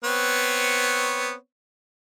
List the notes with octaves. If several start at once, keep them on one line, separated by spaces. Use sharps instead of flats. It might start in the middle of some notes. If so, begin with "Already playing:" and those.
B3 C4 C#5